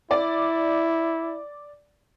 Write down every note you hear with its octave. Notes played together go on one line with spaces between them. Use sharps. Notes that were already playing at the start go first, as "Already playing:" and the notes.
E4 D5